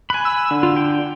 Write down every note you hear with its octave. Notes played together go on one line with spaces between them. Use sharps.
G#5 B5 F#6
E6
D3
F4
G5